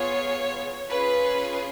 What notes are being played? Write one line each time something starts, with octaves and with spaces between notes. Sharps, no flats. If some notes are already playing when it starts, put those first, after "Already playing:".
Already playing: B3 F4 G#4 C#5
C#4 F4 G#4 B4